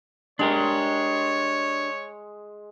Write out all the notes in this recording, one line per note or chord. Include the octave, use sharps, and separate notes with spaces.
G#3 D4 G4 A#4 C#5